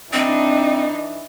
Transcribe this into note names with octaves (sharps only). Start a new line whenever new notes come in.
E3 C4 D4 D#4